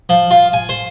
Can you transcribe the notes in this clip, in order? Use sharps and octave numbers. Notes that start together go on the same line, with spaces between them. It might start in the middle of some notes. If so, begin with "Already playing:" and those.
F3
F4
G#5
C5